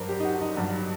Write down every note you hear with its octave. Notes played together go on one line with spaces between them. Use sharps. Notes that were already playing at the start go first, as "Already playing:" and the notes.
Already playing: G2 F#3 A#4 C5 D5
G4
D#4
F#4
D#4
G2 F#3 D4